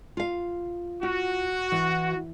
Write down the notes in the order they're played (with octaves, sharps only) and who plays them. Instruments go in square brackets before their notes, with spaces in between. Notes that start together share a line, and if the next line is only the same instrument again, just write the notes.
[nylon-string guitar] F4 F5
[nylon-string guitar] F4 [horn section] F#4
[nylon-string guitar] E3